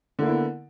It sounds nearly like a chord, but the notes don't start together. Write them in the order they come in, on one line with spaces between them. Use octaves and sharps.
D3 A#3 E4 B3